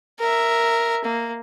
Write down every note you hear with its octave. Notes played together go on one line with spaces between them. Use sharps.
A#4 E5
A#3